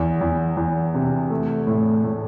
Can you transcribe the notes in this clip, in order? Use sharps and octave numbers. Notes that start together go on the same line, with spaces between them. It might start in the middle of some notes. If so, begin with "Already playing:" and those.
Already playing: E2
E2
E2
C3
A3
A2
A2